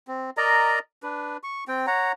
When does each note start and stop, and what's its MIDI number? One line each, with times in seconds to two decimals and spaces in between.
0.08 0.30 60
0.37 0.79 70
0.37 0.79 74
0.37 0.79 75
0.37 0.79 82
1.03 1.37 62
1.03 1.37 71
1.43 1.64 85
1.68 1.86 60
1.68 1.86 79
1.87 2.12 73
1.87 2.12 78
1.87 2.12 82